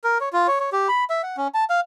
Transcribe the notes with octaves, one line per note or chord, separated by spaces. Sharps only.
A#4
C#5
F4
C#5
C#5
G4
B5
E5
F#5
C#4
A5
F5